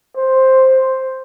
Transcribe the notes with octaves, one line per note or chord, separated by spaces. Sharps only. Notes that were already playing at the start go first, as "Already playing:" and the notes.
C5